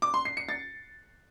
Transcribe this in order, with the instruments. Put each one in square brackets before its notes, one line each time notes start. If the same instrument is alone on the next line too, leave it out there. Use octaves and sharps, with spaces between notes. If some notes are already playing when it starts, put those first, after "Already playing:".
[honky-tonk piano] D6
C6
C7
C#7
A6